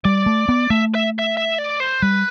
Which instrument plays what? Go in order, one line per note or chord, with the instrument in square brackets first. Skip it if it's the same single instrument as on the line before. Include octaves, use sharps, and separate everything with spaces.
[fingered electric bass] G3 [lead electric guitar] D5
[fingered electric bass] A3
B3
[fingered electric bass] A3 [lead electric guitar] E5
[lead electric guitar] E5
E5
E5
D5
C5
[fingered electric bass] G3 [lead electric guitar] B4